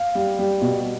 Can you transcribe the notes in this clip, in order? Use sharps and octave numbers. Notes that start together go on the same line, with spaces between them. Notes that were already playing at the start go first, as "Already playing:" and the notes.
Already playing: F5
G3
G3
B2